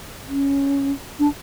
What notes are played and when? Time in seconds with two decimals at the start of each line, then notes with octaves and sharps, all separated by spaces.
0.28 C#4
1.19 D4